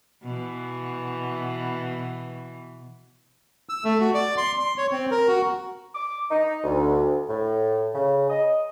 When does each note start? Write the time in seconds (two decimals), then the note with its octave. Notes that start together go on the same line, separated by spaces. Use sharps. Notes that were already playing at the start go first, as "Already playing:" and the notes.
0.22 B2 E3
3.69 E6
3.84 A3
4.00 F#4
4.14 D5
4.37 C6
4.60 C6
4.78 C#5
4.92 C4
5.11 A#4
5.28 F#4
5.95 D6
6.30 D#4
6.63 D2
7.28 A2
7.94 C#3
8.29 D#5